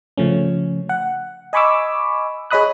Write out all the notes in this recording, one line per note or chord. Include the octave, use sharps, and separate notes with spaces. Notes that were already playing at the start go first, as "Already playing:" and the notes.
C#3 F3 A3 C#4
F#5
D#5 G#5 B5 C#6 D6 E6
G#4 C#5 D#5 B5 D#6 F#6